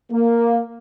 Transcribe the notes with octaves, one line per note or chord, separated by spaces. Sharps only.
A#3